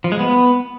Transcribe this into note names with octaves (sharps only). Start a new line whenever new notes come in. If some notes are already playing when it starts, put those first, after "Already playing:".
F3
G#3
B3